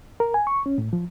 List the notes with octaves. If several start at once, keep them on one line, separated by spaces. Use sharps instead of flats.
A#4
G#5
C#6
C#4
A2
F3